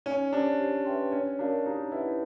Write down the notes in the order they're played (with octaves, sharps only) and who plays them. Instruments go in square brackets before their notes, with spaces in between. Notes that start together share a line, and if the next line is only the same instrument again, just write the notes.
[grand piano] C#4 [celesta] D#4
[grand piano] D4 [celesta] G4 C5
[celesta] G4
B4 E5 G5 C6
[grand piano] C#4 [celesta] D4
[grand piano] D4 [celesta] F#4 A#4 C#5 F5
[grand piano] D#4 [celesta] G4
[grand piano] E4 [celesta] B4 D#5 F#5